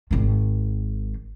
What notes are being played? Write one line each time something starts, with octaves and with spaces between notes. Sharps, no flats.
G#1 D#3